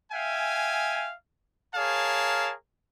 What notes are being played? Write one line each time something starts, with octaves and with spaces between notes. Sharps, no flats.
E5 F5 G5 G#5
G#4 A#4 C#5 F5 A5